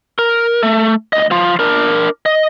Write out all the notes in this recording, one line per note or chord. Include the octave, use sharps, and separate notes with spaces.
A#4
A3
D2 D#5
F3 F4
D4 A#4
D#5